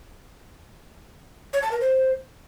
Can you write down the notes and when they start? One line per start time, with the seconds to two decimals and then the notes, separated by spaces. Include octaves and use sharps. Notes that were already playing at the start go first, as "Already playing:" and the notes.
1.53 C#5
1.62 A5
1.71 A#4
1.80 C5